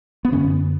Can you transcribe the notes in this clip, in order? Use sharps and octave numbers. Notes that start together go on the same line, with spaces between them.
B3
F#2 D3 C#4